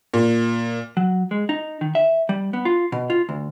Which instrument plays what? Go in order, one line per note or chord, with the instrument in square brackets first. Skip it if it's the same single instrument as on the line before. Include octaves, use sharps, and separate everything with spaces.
[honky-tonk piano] A#2
[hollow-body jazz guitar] F#3
G#3
D#4
D#3
E5
G3
B3
F4
B2
F4
D2